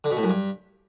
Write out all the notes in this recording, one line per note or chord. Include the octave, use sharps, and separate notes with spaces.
D3
B2
A2
F#2
G2